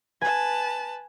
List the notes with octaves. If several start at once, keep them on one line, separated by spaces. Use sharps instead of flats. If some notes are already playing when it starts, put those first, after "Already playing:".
B4 G#5 A5